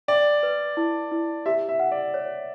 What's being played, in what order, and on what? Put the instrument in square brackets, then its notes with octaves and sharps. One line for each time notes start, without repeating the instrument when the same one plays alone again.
[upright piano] D5 [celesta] G5
[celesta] B4
E4
E4
[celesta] G4 [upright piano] E5
[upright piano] E5
[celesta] F#5
[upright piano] D5
[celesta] C#5